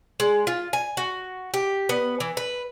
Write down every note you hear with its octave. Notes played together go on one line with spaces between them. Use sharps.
G#3
F4
G#5
F#4
G4
B3
E3
B4